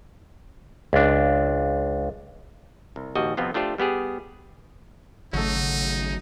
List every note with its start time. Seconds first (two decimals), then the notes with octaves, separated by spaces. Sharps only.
0.93 C#2 D4
2.96 C2
3.15 A#1 D#2 G3 F#4 D#5
3.37 F2 C3 F3 B3 C4 F4
3.54 A3 D4 F4 G4 C5 D5
3.78 G3 B3 G4 G#4
5.33 G#1 C#3 F#3 A3 D#4